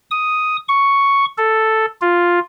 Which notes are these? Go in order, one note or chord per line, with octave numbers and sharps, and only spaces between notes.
D#6
C#6
A4
F4